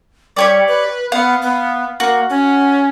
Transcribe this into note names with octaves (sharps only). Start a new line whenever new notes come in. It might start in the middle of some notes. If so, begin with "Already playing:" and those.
G3 G4 C#5 D5
B4
B3 F5 F#5
B3
A#3 F#4
C#4